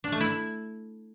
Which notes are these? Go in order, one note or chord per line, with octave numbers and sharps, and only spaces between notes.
D4
A3
E4